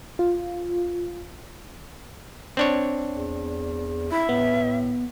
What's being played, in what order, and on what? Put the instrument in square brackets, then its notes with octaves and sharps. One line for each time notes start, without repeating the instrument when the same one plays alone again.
[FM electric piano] F4
[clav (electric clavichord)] C4 D4 C#5
[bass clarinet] E2
[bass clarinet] E4 [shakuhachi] E5
[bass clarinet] A2 [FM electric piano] B3